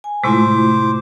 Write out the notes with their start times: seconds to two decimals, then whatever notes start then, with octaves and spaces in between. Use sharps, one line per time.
0.04 G#5
0.24 A2 C3 G#3 A3 E4 F4 C5 D6